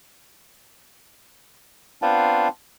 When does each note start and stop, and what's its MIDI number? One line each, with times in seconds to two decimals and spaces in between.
2.02 2.48 59
2.02 2.48 60
2.02 2.48 62
2.02 2.48 65